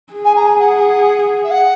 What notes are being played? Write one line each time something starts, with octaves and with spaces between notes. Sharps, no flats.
G#4
G#5
A#5
G#5
F#5
E5
F#5